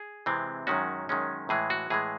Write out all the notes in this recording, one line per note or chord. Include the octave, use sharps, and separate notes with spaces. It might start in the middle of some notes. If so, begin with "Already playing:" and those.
Already playing: G#4
C3 E3 G#3 C4
F#2 D#3 G#3 C#4 F#4
F#2 D#3 G#3 C#4
A2 E3 G#3 G#4
F#4
A2 E3 G#3 G#4